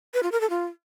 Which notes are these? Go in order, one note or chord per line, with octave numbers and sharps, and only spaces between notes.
B4
F4
A#4
A4
F4